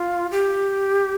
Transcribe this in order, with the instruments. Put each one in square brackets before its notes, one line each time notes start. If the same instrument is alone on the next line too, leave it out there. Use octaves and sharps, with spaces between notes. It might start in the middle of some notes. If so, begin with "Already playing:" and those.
Already playing: [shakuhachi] F4
G4